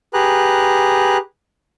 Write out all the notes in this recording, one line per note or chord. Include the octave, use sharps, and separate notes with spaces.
G4 G#4 B4 A#5 F#6